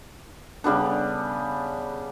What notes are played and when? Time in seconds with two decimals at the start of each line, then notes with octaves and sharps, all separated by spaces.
0.64 C#3 G3 B3 D4